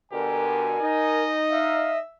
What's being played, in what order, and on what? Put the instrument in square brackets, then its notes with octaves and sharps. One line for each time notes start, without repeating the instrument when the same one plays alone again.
[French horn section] B2 D3 [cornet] G4 [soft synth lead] A#4 [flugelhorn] G#5
[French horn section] D#4 [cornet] D#5
[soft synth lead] E5 [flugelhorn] F5